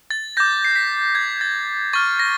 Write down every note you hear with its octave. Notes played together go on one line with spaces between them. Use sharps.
A6
D6 G6 A#6
C7
B6
G#6
A6
C#6 F6 A6
A#6